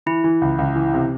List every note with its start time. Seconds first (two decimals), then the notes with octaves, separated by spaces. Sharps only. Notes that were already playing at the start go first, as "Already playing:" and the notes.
0.06 E3 E4
0.24 E3
0.41 C#2
0.58 C#2
0.76 E3
0.94 C3